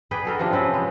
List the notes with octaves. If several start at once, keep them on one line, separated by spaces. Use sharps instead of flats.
G#4 B4 D5 G5
F#4 A4 A#4
C3 F3 D4
C4 C#4 B4
G#3